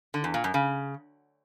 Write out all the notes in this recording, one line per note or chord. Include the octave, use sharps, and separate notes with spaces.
D3
E2
A#2
F#2
C#3